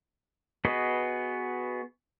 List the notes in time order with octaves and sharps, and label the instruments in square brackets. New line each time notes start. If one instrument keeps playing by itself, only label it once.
[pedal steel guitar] B3 F#4 G#4 B4 D#5